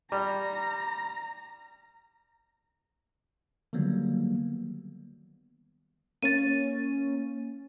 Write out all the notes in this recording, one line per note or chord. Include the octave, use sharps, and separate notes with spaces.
G3 A#5
D3 D#3 F#3 G3 A#3 B3
A#3 C#4 A6 D#7